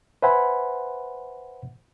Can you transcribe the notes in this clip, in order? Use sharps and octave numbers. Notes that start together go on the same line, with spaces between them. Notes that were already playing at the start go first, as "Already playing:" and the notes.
B4 C5 E5 F#5 G#5 B5